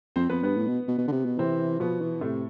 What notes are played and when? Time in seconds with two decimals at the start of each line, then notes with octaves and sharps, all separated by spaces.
0.16 F2 C4 C5
0.30 F2 B3 B4
0.43 G2 B3 B4
0.57 A2
0.67 B2
0.88 B2
0.98 B2
1.08 D3
1.12 C3
1.25 B2
1.39 C3 E3 C4
1.80 B2 F3 B3
2.01 E3
2.21 A2 C3 A3